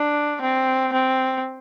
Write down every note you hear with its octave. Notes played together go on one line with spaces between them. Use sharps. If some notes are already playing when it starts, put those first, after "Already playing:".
Already playing: D4
C4
C4